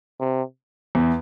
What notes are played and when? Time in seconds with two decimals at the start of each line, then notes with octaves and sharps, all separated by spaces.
0.20 C3
0.95 E2